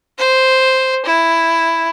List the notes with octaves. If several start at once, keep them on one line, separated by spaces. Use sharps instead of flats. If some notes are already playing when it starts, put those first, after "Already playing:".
C5
E4